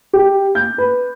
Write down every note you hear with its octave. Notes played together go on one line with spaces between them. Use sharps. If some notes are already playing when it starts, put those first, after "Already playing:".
G4
G6
B4